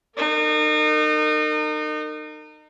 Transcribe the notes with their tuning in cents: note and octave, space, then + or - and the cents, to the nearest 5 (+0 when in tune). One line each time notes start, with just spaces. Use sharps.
D#4 -30 A#4 -35